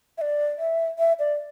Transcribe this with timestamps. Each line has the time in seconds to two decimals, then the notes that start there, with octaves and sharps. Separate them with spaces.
0.18 E5
0.21 D5
0.58 E5
0.99 E5
1.19 D5